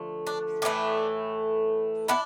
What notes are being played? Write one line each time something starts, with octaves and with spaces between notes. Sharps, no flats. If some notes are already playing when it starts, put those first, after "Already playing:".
Already playing: D3 F3 A3
D4
A2 E3 A3 D4
B3 D4 E4